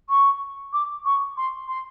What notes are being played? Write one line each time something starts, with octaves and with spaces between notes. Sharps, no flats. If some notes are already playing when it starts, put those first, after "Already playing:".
C#6
D6
C#6
C6
C6